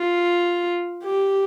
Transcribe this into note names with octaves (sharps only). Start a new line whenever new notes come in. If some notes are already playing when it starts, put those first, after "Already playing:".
Already playing: F4
G4